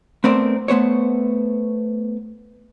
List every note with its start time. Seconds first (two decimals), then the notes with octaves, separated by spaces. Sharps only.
0.24 A3 B3 C4 A#4 C5 D5
0.68 A3 B3 C5 C#5